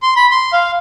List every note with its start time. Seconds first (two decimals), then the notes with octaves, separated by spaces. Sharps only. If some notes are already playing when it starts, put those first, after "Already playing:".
0.03 C6
0.16 B5
0.31 C6
0.53 F5